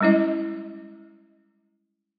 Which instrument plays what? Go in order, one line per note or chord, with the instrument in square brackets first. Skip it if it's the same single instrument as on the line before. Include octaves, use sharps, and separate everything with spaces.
[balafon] G3 G#3 C#4 E4 D#5